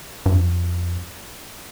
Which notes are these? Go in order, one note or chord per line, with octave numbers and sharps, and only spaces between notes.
G2
F2